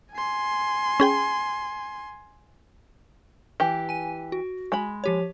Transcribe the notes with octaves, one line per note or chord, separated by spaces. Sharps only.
G#5 C6
C#4 G#4 G5
E3 G4
G#5 D#7
F#4
G#3 B5
F3 G4 C#5